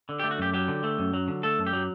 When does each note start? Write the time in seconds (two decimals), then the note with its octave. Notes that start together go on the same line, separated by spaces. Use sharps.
0.09 D3
0.19 G4
0.24 A3
0.31 F#4
0.38 F#2 G4
0.54 F#3 G4
0.68 D3
0.84 A3
0.99 F#2
1.14 F#3
1.28 D3
1.43 A3 A4
1.58 F#2
1.67 G4
1.73 F#3